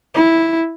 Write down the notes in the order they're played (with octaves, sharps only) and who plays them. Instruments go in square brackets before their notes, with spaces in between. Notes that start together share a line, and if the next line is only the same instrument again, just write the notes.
[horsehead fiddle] E4